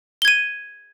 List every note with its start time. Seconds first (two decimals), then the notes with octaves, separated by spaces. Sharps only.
0.22 G7
0.25 G#6
0.28 D#7